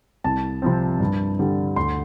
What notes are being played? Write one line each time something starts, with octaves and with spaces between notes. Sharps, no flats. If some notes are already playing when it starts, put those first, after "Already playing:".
C2 A5
C3 F3 C4
G2
D3 G3
D2 C6